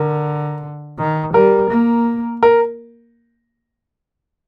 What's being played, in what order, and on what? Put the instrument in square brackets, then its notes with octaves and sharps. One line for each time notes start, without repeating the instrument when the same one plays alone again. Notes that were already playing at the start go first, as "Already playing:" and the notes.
Already playing: [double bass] D3 [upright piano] A#4
[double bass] D#3
[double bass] G3 [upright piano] A#4
[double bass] A#3
[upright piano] A#4